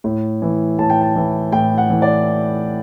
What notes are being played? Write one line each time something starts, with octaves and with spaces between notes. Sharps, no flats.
A2
E3
A2 A5
G5
A5
E3
A2 G5
F#5
E3
D5